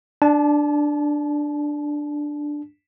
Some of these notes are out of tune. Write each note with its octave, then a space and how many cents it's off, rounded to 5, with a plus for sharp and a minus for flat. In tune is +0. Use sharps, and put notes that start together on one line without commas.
D4 +5 A5 -35